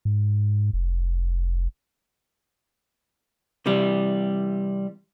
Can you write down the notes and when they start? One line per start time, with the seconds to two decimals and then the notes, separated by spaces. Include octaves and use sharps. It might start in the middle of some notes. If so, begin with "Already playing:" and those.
0.05 G#2
0.73 F1
3.66 C3 E3 G3